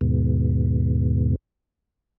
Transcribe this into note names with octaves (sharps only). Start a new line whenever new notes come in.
D#2 G#2 B2